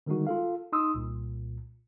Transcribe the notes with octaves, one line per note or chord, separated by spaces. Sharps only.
D3 D#3 G3 G#3 D#4 F#4
F4 A4 F5
D#4 C6 D#6 E6
C2 A#2